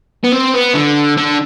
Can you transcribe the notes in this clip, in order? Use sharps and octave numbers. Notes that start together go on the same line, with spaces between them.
B3
C4
B3
D3
D3